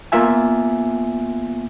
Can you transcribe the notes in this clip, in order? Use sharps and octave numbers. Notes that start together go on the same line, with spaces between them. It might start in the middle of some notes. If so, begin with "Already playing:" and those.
A#3 B3 F4 E5 G#5